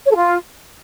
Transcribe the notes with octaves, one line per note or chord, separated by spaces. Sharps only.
C#5
A4
F4